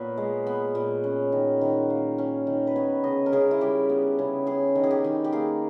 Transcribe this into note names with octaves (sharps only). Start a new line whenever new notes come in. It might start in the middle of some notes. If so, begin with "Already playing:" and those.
Already playing: A#2 B3 B4 C#5
G#3
B3
A#2
C#4
D#3
D#3
A#3
C#4
D#3
B4
B3 C#5
C#3 D#5
A#4
C#3 G#4
E4
G3 G4
B3
C#3
C#4 G#4
D#3
G#4
G4
D#3
G4
A#3 G#4